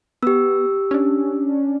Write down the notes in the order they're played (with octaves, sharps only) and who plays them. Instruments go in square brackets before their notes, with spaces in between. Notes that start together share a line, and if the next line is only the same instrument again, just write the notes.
[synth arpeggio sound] B3 [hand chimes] G4 E6
[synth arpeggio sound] C#4 D4